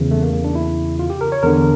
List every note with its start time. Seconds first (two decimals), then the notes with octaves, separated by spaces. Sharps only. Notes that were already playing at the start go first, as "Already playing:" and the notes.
Already playing: E2 C#3 E3
0.11 A3
0.22 A#3
0.33 A#3
0.44 D4
0.55 E4
0.99 F4
1.10 G4
1.21 A#4
1.32 C#5
1.43 E2 D3 A#4